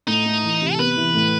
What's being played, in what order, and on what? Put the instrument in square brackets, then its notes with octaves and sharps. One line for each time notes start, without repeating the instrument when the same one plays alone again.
[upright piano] A2 [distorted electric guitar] D#4
[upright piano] A3
E3
C3
[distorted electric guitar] A4
[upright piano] B3 [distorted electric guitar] B4
[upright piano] E3
A2